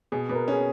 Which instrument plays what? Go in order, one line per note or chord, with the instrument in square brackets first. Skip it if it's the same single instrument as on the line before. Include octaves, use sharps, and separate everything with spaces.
[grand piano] B2 [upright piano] G#4
[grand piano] B2 [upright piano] B4
[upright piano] A#4
[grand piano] C#4 [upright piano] G#4